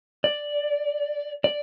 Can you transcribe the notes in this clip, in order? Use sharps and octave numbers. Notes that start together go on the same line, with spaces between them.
D5
D5